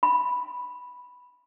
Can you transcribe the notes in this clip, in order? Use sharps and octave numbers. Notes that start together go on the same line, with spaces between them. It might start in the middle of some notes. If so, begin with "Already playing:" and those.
B5